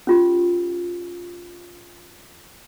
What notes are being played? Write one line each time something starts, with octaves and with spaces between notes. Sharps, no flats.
C#4 F4 G4